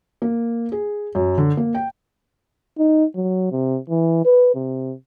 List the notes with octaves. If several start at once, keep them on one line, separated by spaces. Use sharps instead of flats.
A#3
G#4
F#2
D3
A#3
G5
D#4
F#3
C3
E3
B4
C3